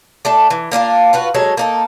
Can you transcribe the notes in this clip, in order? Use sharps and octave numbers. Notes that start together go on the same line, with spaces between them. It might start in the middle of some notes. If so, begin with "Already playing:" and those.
A3 D4 A4
E3
A#3 D4 E4 F4
F4 F#4 B4
F#3 G#3 A4 C#5
A#3 D#4 A4